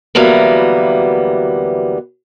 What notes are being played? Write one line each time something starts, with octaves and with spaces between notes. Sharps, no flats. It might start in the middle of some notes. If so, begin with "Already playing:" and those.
D2 E3 F#3 G3 A#3 B3